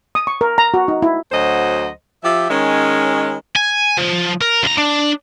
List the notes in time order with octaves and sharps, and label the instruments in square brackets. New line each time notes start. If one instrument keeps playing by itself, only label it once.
[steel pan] D#6
C#6
A#4
A#5
F#4
D#4
E4
[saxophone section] D2 F#3 C5 D#5
F3 G4 E5
D#3 G#3 C#4
[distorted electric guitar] G#5
F3
A#4
C#2 A#5
D4